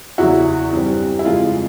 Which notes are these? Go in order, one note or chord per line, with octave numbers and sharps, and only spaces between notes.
E2 C#3 F#3 E4 F#4
G2 E3 G3 C4
E4
F2 C#3 E3 G#3 F4